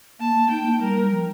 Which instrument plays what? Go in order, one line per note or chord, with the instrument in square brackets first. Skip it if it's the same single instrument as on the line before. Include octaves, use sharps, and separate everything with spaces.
[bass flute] A#3 [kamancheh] A5
[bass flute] A#3
[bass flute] D#4 [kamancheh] G5
[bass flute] A#3
[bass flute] G3 [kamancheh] A#4
[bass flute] G3
F3